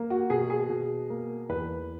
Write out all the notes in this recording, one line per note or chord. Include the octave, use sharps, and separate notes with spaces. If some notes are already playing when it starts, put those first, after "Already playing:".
Already playing: A#3
F#4
B2 G#4
G#4
B2
A#3
E2 B4